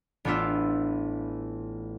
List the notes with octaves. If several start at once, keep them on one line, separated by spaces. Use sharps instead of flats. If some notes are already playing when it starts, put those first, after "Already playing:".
A1 B3 D4 F4 E5